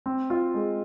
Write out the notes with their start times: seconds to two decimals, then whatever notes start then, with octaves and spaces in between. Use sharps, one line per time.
0.06 C4
0.30 F4
0.54 G#3